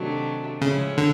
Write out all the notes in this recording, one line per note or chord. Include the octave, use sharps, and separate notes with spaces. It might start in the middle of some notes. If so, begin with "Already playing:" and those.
Already playing: C3 D#3 F#3 A3 D4
A2 C#3 F3 G#3 C#4 E4
D3